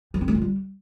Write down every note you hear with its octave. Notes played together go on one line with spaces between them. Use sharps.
F3
C4
A3
F4
G3